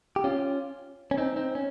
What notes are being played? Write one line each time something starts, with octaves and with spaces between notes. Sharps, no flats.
G4
C#4 F4
C#4
C4 D#4
C4 D#4
C#4